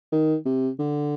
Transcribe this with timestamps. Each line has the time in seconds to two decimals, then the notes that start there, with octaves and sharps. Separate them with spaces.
0.12 D#3
0.46 C3
0.79 D3